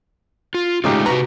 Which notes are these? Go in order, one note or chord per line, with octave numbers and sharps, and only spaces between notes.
F4
C#3 G#3 A3 D#4 F4 G4
C3 F#4 B4 A#5